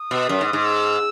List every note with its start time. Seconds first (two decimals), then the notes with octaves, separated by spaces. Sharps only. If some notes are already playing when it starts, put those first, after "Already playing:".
Already playing: D#6
0.11 B2
0.29 F#2
0.41 G#2
0.53 G#2
0.65 E6